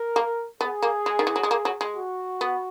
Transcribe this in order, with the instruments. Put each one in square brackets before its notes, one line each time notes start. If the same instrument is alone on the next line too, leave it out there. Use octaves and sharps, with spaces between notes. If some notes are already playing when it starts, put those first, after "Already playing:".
Already playing: [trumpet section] A#4
[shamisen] A#3
[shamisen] B3 [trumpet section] G#4
[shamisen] A#3
G#3
D#3
E3
F#3
G#3
A#3
F#3
G#3
[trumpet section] F#4
[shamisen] B3